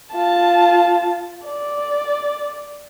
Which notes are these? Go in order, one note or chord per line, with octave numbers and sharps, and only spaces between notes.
F4 A5
D5